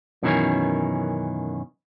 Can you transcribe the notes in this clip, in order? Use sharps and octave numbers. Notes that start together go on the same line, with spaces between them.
F#2 B2 D#3 E3 C#4